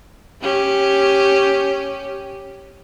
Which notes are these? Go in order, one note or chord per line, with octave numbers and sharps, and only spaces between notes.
C#4 G4